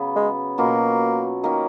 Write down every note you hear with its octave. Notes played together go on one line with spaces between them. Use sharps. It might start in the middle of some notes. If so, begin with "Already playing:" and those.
Already playing: C#3 F#3 B3
G#3
B2 F#3 A#3 C#4 F4
D#3 A#3 C#4